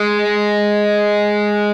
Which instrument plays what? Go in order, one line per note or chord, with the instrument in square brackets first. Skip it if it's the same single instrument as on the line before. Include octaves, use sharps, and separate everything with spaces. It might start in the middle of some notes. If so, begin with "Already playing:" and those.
Already playing: [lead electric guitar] G#3